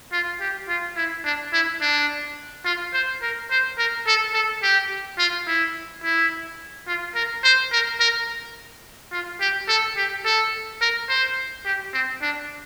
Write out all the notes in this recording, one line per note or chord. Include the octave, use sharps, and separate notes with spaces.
F4
G4
F4
E4
D4
E4
D4
F4
C5
A#4
C5
A#4
A4
A4
G4
F4
E4
E4
F4
A#4
C5
A#4
A#4
F4
G4
A4
G4
A4
A#4
C5
G4
C4
D4